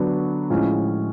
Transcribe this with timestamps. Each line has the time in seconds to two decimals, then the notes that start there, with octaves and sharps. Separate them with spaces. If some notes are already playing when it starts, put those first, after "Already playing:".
Already playing: D3 F#3 B3 D4 F#4
0.50 A2 F3 G#3 C#4